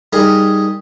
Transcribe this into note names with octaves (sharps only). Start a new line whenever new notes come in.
G3 D#4 G#4 A#4